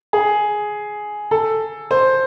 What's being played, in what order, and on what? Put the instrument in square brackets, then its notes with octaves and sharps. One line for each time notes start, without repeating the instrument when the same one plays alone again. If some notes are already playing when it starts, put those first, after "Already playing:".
[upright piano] G#4
A4
C5